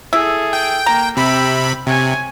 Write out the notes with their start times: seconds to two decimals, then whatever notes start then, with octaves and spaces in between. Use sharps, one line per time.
0.13 E4 G#4 A4 E5
0.53 G5
0.86 A#3 A#5
1.17 C3 G5 B5 E6
1.87 C3 C#5 G#5